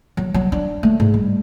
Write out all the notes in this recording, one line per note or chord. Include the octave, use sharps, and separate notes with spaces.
F#3
F#3
D4
A3
G#2
G3